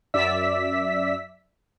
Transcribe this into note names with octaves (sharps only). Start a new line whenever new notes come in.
F#2 D5 E5 E6 B6